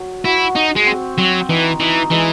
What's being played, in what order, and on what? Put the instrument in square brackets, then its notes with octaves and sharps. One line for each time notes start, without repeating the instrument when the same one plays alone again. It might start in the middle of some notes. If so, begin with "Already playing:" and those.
Already playing: [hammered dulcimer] F#3
[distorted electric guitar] E4 [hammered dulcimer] F#4
[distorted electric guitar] D#4 [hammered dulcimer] F#4
[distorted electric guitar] G#3
[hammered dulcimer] C4
[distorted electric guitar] F#3 [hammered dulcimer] C4
[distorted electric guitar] E3 [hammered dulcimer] D#4
[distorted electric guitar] E3 [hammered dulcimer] D#4
[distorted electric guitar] E3 [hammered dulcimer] G#3